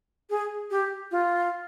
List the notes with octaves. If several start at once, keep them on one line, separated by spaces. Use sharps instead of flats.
G#4
G4
F4